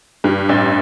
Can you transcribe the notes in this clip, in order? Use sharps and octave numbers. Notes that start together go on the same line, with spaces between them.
G2
A1